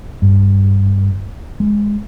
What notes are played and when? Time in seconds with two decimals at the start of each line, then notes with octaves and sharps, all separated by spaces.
0.22 G2
1.60 G#3